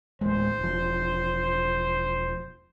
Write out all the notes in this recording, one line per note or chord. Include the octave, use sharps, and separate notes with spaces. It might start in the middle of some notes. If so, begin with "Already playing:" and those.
D1 A1 G#3 C5
E1 F3